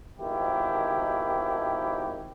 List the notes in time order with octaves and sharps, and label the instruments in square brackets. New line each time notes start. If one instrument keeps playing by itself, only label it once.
[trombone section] G#1 B2 D#3 F3 E4 G4